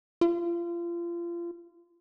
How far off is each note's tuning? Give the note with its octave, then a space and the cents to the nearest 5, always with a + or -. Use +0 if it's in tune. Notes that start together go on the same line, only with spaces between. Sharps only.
F4 -30